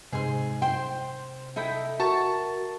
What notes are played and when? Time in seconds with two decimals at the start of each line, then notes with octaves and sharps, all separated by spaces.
0.12 G#2 C3 G#4 C6
0.62 C5 G5 C6
1.56 D#4 E4 A4 E5 G5
2.00 F#4 A#4 A5 C#6 A6